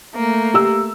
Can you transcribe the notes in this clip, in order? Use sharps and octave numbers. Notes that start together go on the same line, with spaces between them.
A3 A#3
G4 E6